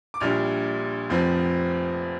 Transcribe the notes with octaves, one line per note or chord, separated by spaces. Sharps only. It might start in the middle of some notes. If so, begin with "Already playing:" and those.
D6
A#1 A#2 G3 D4 F6
F1 F2 F3 C4